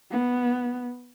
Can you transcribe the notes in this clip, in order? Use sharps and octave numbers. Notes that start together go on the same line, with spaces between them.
B3